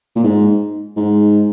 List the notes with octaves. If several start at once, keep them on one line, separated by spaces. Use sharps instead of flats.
A#2
G#2
G#2